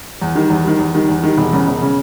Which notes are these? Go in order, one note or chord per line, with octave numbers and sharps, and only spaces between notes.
E2
D#3 G3
E2
D#3 G3
E2
D#3 G3
E2
D#3 G3
E1
E2 C#3
E1
C#3